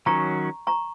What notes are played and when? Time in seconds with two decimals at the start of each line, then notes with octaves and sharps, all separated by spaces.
0.06 D#3 F#3 C#4 F#4 A#5 C#6
0.67 A#5 C#6